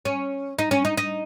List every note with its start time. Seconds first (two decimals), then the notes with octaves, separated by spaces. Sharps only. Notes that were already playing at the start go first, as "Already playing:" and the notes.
0.05 C#4
0.59 D#4
0.71 C#4
0.85 D#4
0.97 D#4